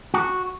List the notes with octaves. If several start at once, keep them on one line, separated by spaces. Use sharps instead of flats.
F#4